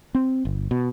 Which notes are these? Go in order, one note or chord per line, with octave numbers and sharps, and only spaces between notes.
C4
G1
B2